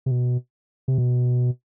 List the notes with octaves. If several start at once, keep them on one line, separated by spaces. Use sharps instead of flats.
C3
B2
C3
B2